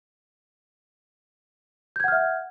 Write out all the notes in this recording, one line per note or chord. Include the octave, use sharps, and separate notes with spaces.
E5 F#5 F6 G6 G#6